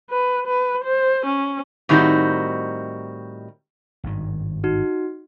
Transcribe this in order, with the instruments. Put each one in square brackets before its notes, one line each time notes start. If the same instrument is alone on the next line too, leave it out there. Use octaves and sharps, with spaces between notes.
[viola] B4
B4
C5
C#4
[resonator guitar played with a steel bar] A2 D#3 G3 C4 D#4 F#4
[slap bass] G#1 G2 D#3
[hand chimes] D#4 F#4